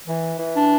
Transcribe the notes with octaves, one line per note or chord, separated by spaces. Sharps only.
E3
E3
D4